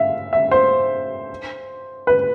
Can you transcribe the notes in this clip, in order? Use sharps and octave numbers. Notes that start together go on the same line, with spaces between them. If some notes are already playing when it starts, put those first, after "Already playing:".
Already playing: E5 F5
E5
C5
B4